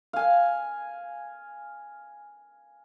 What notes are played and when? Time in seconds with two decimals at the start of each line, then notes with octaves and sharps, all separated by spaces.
0.13 F5 G#5